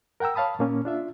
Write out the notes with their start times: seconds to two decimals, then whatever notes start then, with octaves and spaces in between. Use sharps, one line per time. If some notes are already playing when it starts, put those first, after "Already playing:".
0.20 A#4 F#5 G5 A#5 E6
0.35 C#5 F5 A5 B5 D#6
0.59 A#2 A#3 C#4
0.85 D4 F4 E5